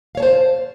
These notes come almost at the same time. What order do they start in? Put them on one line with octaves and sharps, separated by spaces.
F5 C#5 A5 C5